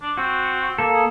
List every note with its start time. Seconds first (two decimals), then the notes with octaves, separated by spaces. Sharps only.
0.02 D4
0.17 C4 F#4
0.79 A#3 A4
0.93 G#4